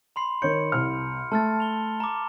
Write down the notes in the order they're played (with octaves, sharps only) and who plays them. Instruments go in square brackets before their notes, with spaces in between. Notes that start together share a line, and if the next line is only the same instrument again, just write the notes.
[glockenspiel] B5 C6 C7
[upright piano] D#3 C#5 G6 [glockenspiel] C#7
[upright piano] C2 F6
[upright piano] A3 [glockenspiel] A5 F6 A6
[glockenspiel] F7 G7
A#5 D6